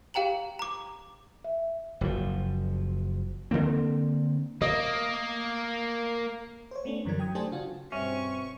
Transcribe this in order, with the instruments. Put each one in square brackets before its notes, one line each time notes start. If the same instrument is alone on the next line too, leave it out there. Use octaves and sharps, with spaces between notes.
[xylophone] G4 F5 G5 A#5 F#7
A#5 D6
[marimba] E5
[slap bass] F#1 F3
D3 F#3 A#3 C4
[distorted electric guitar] A#3 [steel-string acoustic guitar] D#5
[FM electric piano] C5 C#5
A3 B3 C#4 D4
F#2 D3 E3 G3 A#4 G#6
F#3 G5 D#6 G#6
A3 D4 G4 C5 G#5 A5
C#3 F4 F#4
[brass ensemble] G2 B2 C4 [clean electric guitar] C#4 [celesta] E5 [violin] C#6